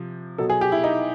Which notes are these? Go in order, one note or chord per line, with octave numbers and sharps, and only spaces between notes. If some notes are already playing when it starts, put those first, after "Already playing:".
Already playing: C3 F3
B2 F#3 A4
G#4
G4
E4
D#4